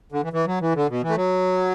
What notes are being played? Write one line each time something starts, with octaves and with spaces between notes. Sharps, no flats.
D3
E3
E3
F#3
E3
D3
B2
E3
A3
F#3